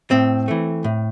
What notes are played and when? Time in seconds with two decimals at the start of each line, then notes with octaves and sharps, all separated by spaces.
0.11 A2 C4
0.48 E3 A3
0.84 A2